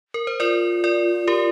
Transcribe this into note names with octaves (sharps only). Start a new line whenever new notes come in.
A#4
C5
F4 A#4 D5
A#4 D5
G4 A#4